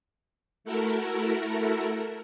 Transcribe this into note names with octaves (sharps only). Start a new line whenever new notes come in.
A3 E4 F#4 A4 A#4